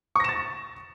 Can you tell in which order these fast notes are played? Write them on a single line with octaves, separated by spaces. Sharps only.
C#6 A#6 E7 A6